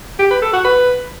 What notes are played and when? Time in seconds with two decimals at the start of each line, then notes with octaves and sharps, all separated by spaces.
0.19 G4
0.30 B4
0.42 A4
0.53 F#4
0.64 B4